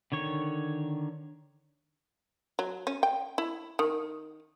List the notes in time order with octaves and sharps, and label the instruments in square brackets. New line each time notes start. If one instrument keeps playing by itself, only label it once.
[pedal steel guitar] D3 D#3 C#5 C#6
[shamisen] F#3
C#4
G5
E4
D#3